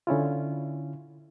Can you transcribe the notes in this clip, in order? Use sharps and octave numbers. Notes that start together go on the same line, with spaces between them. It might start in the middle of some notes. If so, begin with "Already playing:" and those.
D3 C#4 E4 F4